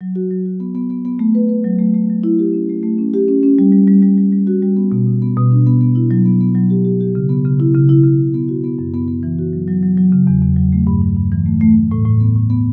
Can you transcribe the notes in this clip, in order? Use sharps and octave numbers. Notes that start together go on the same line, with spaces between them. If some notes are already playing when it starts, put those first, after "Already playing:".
F#3
F#4
F#3
F#4
B3
B3
B3
B3
A3
B4
B4
F#3
A3
A3
F#3
E4
G4
C#4
A3
A3
C#4
G4
C#4
C#4
G3
G3
G3
G3
G3
G3
F#4
G3
B3
B2
B2
B3
B2
D4
B3
B3
E4
F#3
B3
B3
F#3
G4
G4
G4
C#3
B3
C#3
E4
C#3
E4
C#3
C#3
B3
F#4
B3
F#2
B3
B3
E3
F#4
F#3
F#3
F#3
F#3
C#3
E2
E2
F#3
A3
G2
G2
G2
E3
A3
A3
A3
A2
A2
B3
A2
B3